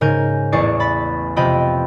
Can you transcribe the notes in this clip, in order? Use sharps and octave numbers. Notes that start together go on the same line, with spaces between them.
G#2 C#3 A#4 G#5 G6
A1 E2 G#4 D5 C#6 C7
B5 A6 B6
F2 C3 F4 D#5 G5 B5